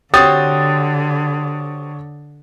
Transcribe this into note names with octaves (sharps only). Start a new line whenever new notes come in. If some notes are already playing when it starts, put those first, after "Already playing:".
D3 C4 F#4 G4 C#5 D#6 A6